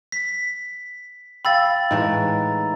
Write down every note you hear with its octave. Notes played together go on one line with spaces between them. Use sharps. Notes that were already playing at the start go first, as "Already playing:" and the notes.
B6
F5 G5 B5 E6 A6
A2 E3 G#3 D#4